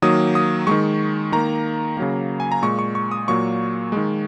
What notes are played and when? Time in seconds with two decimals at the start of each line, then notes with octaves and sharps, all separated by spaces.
0.02 D#3 F#3 A#3 D#6
0.35 D#6
0.67 D#3 G#3 C#6
1.32 D#3 A#3 A#5
1.97 C#3 F#3 A#3
2.40 G#5
2.52 A#5
2.62 A#2 G#3 C#6
2.79 C#6
2.95 C#6
3.11 D#6
3.28 A#2 F#3 A#3 C#6
3.92 D#3 G#3